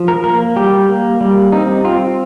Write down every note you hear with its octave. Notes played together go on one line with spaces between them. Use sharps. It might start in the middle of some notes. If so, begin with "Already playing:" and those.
Already playing: F3
A#4
A#3 A#4
G3 G4
A#3
G3
C4 D#4
C4 F4